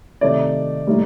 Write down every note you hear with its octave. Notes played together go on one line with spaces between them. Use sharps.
C3 D#3 A3 D#4 D5
A2 G3 A#3 D#4